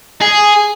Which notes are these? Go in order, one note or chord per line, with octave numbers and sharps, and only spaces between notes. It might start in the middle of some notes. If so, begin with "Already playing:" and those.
G#4